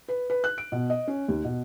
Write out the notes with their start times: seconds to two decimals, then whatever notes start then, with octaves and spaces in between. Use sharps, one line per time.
0.08 B4
0.30 B4
0.44 F#6
0.58 D7
0.72 B2
0.90 D#5
1.07 C#4
1.28 D#2
1.44 B2